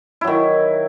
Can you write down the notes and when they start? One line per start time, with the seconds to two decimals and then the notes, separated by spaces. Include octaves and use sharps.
0.21 E4
0.24 F#3
0.27 D#3